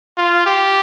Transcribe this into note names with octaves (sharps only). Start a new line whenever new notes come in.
F4
G4